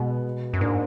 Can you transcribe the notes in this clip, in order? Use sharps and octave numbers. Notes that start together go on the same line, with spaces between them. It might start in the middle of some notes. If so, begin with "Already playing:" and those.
Already playing: B2 G#3 B3
F#2
G#2 A#3 D4